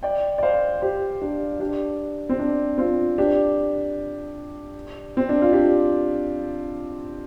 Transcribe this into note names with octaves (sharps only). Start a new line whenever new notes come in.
D5 G5
D5
C5 F5
G4 C5
D4 G4
D4 G4
C4
D4
C4 F4
D4 G4
C4
D4
F4
D4 G4